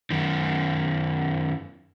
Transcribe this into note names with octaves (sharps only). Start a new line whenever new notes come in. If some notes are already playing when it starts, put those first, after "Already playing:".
F#2 D#3